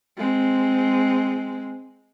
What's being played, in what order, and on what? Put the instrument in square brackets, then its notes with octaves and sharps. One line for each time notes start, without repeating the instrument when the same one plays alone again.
[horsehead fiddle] G#3 C4